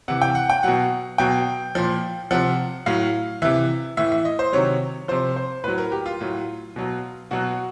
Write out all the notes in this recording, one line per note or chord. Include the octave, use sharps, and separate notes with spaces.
C3 E3 F#5
G5
F#5
G5
B2 F#3 F#5
B2 F#3 G5
A#2 F3
C3 F3 F#5
A2 F#3 F5
C3 E3 E5
A2 E3 E5
E5
D#5
C5
C3 D#3 F#3 C#5
C3 F3 C5
C5
A2 F#3 B4
A#4
G4
F4
A2 F#3
B2 F#3
B2 F#3 F#4